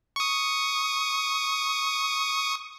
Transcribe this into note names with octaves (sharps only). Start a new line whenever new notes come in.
C#6 D#6